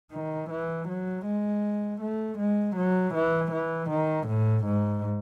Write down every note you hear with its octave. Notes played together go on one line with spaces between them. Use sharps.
D#3
E3
F#3
G#3
A3
G#3
F#3
E3
E3
D#3
A2
G#2